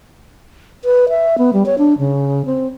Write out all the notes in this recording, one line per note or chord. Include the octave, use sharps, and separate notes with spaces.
B4
E5
B3
G3
C#5
D4
C#3
C4